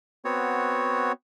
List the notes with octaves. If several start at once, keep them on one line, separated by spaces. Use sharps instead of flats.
B3 C4 F#4 C#5